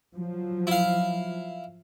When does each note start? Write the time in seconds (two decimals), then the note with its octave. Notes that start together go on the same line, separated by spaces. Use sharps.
0.14 F3 F#3
0.67 E4 F5